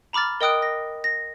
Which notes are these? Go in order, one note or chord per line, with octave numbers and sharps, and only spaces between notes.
A#5 B5 D6 F6 A6
A#4 D#5 G5 D#6 F#6 D7
A#6
A#6